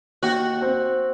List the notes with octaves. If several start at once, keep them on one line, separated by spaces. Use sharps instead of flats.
D#2 F#4
C4